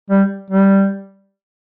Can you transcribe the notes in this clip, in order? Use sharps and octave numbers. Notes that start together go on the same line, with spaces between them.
G3
G3